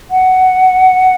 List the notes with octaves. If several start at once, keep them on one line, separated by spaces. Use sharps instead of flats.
F#5